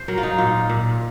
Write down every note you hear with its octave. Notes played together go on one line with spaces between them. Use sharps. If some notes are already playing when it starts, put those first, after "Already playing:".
Already playing: C5
F#3 A#4
F4
D#4
A#2 F4
A#2